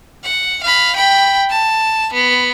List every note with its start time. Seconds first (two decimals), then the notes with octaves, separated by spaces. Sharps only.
0.25 F#5
0.63 F5 B5
0.96 G5 B5
1.50 A5
2.13 B3